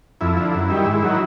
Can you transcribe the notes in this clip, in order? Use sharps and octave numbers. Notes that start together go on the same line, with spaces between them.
F2 E4
D3 F3
F#2
D#3 G3
G#2
D#3 F#3